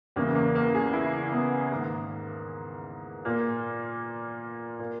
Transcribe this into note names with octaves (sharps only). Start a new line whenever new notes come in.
E2 C#3 E3 A#3
A#3
A#3
G#4
E4
B3
G#2 D#3 A#3
A#2 A#3
A#2 A#3